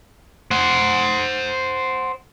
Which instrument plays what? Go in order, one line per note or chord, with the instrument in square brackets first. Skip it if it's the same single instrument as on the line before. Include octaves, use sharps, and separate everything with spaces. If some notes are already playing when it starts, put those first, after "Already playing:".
[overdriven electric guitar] C5 F#5